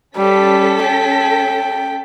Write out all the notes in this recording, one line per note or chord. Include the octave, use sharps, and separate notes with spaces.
G3 C#4 A4 B6
G5